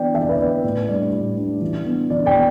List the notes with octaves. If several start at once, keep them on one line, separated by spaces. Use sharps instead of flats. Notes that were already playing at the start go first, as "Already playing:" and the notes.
Already playing: E3 B3 D4 D5 G5
E3 E5
D5
B4
B3 D4 D5
A2 B4
G3 D4 D5
A2
G3 D4
E3
B3 D4
E3 D5
D5 G5
B3